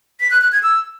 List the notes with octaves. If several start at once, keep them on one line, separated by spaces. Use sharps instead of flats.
B6
F#6
F#6
G#6
E6